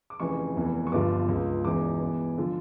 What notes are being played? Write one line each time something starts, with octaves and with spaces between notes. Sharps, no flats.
D6
F1 F2 C#3 E3 C#6
F1 E2 E3
C#6
G1 G2 D3 F3 D6
C#2 C#3 F3
E1 E2 E3 D6
E2 E3
D3 F3